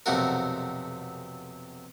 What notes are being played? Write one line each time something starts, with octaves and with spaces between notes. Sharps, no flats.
B1 F2 C3 A3 F#4 A#4